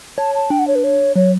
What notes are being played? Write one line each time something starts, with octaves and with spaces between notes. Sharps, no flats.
C#5 A5
A5
D4 G5
F#5
C#5
B4
C#5
F#3 C#5